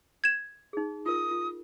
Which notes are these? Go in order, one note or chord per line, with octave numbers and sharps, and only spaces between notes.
G#6 E7
D#4 G#4
F4 A#4 D#6
F4